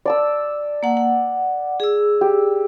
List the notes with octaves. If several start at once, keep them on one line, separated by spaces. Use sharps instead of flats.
D5 A5 E6
A#3 F#5
F#5
G#4 E6
G4